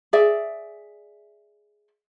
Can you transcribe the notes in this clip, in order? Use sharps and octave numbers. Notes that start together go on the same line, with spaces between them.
G#4 D5 E5